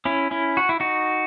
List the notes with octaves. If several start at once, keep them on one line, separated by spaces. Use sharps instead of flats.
C#4 E4
C#4 E4
F#4
E4
D#4 F#4